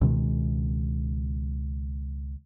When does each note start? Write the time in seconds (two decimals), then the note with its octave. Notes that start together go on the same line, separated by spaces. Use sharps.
0.01 C#2 B2 D#3 G#3